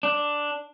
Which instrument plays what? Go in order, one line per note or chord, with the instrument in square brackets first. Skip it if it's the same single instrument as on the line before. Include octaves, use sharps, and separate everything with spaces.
[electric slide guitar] D4